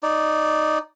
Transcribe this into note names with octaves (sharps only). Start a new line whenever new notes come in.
D#4 D5